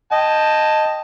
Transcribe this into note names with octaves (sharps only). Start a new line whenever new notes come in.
D#5 G5 A5